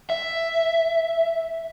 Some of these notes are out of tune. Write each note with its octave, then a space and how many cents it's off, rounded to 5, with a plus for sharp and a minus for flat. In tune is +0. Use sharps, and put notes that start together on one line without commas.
E5 +5